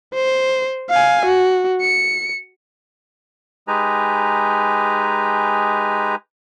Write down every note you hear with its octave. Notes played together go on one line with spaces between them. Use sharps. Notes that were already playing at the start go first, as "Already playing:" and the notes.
C5
F5 G#5
F#4
C#7
G#3 D#4 G4 B4 G#5 A#5